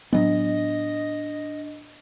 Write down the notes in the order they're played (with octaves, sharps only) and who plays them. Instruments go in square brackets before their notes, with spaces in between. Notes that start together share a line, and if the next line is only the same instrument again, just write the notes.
[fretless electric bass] A2 F#3 B3 [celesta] D4 [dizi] D#5